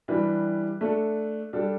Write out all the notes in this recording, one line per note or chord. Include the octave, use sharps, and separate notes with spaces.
E3 G3 D4 G4 B4
A3 D4 A4
G3 D4 A4